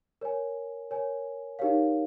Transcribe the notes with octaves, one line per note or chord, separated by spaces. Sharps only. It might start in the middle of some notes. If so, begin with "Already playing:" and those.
A#4 C#5 G#5
A#4 C#5 G#5
D#4 G4 A#4 C#5 F5